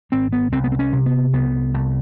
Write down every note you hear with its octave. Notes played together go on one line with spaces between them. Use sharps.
G#1 C4
B3
C2 C4
B3
C4
C#4
C3
B3
C2 B3
C2